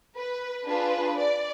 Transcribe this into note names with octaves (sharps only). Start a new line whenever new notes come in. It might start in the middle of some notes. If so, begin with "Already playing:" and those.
B4
D4 F4 G#4 B4
D5